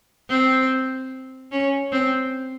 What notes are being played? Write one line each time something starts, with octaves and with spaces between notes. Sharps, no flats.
C4
C#4
C4